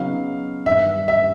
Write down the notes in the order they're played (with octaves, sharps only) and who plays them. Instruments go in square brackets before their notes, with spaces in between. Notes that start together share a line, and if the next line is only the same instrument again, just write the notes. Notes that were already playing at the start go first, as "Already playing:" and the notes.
Already playing: [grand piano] C#3 F#3 B3 D#4 [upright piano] F5
[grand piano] G2 D#3 G3 [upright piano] E5
[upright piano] E5